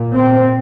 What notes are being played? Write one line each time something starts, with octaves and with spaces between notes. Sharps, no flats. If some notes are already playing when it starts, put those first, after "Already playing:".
Already playing: A#2
C4